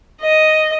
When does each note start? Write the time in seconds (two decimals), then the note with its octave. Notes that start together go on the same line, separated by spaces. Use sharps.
0.22 D#5